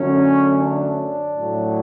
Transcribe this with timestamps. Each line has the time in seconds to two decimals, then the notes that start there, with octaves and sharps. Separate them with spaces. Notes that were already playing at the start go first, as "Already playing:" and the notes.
Already playing: F#2 D3 F#3 A3 C#4
0.59 D4
1.37 A2 F#3 A3